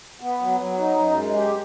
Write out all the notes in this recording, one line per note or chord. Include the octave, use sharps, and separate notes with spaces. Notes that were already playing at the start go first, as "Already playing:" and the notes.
B3
F#3
F#3
D#4
F#2
G#3
G4